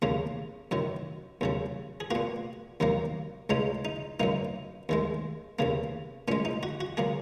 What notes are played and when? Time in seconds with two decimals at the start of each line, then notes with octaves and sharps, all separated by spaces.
0.02 D#2 C#3 A#3
0.71 F#2 D#3 F#3
1.41 D#2 C#3 F#3
2.00 G#4
2.11 A#2 A#3 F#4
2.80 D#2 D#3 F#3 A#3
3.50 C#2 C#3 G#3 D#4
3.85 D#4
4.20 F#2 F#3 A#3 D#4
4.89 D#2 D#3 G#3
5.59 D#2 C#3 A#3
6.28 A#2 C#4
6.32 G#3
6.45 D#4
6.63 F#4
6.81 F#4
6.97 F#3 A#3 G#4